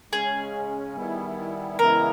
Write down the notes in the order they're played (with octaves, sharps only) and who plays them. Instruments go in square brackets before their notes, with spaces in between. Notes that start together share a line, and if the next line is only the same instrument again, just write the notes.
[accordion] C#3 G#3 C#4 [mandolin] G#4
[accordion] D#3 G3 B3 E4
[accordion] C#3 E3 G#3 B3 E4 [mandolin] A#4